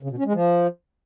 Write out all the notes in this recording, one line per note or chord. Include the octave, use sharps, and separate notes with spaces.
C#3
B2
C#4
G#3
F3